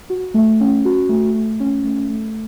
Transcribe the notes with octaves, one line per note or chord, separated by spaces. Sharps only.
F#4
A3
C#4
F#4
A3
A3
C#4
A3
A3